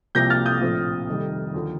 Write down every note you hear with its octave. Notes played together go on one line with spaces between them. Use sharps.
C2 C3 F3 A#3 G6 A#6
F6 A6
D#6 G6
A#1 A2 F3 C4
F1 F2 D#3 G3
D#2 D3 F3